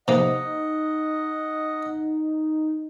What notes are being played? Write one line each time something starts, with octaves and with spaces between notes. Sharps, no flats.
C3 A#3 D#4 D#5 F#5